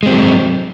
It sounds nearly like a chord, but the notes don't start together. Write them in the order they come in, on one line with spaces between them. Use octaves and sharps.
G#3 C4 F#3